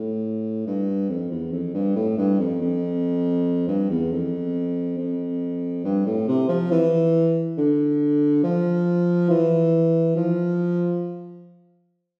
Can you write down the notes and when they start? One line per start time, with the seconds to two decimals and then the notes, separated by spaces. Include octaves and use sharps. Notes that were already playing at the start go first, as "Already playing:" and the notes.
Already playing: A2
0.67 G2
1.09 F2
1.31 E2
1.52 F2
1.74 G2
1.96 A2
2.17 G2
2.39 F2
2.61 F2
3.68 G2
3.90 E2
4.12 F2
4.98 F2
5.84 G2
6.06 A2
6.28 C3
6.49 F3
6.71 E3
7.57 D3
8.43 F3
9.30 E3
10.16 F3